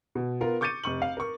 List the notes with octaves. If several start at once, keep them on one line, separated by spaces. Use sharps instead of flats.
B2
B3 F4 A#4
C#6 D6 G6 A6 C#7 D#7
F1 C#6 F#7
F5
A#4 C#6